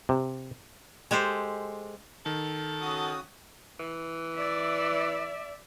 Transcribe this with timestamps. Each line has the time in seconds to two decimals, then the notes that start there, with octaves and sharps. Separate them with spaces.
0.09 C3
1.11 G#3 G4 A4 C5
2.26 D#3 A4
2.81 C#3 F#4 D#6
3.80 E3
4.36 D5 E5